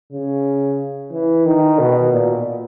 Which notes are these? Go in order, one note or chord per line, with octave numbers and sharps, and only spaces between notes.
C#3
E3
D#3
B2
A#2